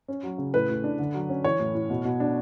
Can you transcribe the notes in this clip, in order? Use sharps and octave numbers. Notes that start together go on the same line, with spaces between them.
C#4
F#3
C#3
A2 B4
A2
D4
D3
F#3
C#4
E3 C#5
A2
A2
B2
B2
D4